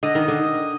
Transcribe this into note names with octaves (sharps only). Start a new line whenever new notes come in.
D3 D#5
D#3
D3